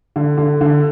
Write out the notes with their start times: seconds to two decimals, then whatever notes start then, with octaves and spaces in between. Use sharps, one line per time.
0.16 D3
0.38 D3
0.61 D3